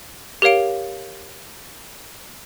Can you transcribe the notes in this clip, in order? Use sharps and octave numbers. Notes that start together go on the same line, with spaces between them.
G4 A#4 C#5 F5 D7